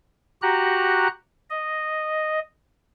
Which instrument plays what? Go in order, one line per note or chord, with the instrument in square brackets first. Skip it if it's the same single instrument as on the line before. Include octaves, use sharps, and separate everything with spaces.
[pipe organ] F#4 G4 A#5 F#6
D#5